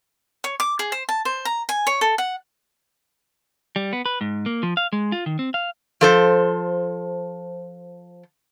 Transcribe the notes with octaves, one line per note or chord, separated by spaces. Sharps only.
C#5
D6
G#4
C5
A5
C5
A#5
G#5
C#5
A4
F#5
G3
B3
B4
G#2
A#3
F3
F5
G#3
F4
D#3
C4
F5
F3 A4 C5